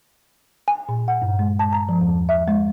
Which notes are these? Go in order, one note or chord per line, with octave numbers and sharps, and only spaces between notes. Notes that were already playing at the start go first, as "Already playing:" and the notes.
G#5
A#2
F#5
G2
G#3
A5
A#5
F3
E2
E5
G#3